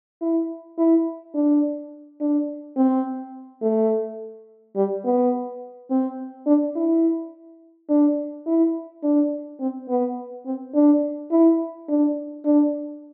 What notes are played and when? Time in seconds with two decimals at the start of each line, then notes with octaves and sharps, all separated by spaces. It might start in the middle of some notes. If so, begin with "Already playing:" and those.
0.21 E4
0.78 E4
1.35 D4
2.21 D4
2.77 C4
3.63 A3
4.76 G3
5.05 B3
5.91 C4
6.47 D4
6.76 E4
7.90 D4
8.47 E4
9.04 D4
9.60 C4
9.89 B3
10.46 C4
10.75 D4
11.32 E4
11.89 D4
12.45 D4